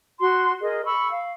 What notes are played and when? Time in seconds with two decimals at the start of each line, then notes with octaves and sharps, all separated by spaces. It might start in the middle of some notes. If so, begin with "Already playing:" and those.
0.19 F#4 C6
0.61 G#4 A#4 D#5
0.84 B5 C#6 E6
1.10 F5